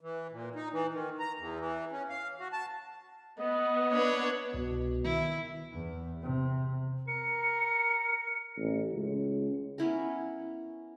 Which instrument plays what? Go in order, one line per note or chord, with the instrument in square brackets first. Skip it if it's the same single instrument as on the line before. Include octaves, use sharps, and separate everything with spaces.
[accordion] E3
A#2
D#4
E3
D#3
A#5
E2
E3
C#4
F5
F#4
A5
[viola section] B3 [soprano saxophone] D#5
[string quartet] D4 B4 C#5
[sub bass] C2 [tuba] B2
[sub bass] D#3 [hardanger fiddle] E4
[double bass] E2
C3
[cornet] A#4 [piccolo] C#7
[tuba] A1
C#2
[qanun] B3 C#4 E4 A#4